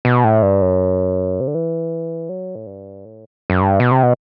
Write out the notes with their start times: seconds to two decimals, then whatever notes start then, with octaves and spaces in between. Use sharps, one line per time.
0.05 B2
0.24 A2
0.42 G2
0.62 F#2
1.40 C3
1.47 D3
1.55 E3
2.29 F#3
2.55 A2
2.67 G2
3.05 A2
3.50 F#2
3.61 G2
3.80 B2
3.91 C3
4.03 B2